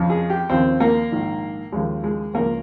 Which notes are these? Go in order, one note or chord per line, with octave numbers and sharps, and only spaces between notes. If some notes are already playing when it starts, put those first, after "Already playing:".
Already playing: F2 C#3 F3
G#4
G4
D#2 C#3 F3 C4
A#3
A#1 G#2 D#3
D#2 C#3 F3 G#3
G#3
C#2 C#3 F3 A#3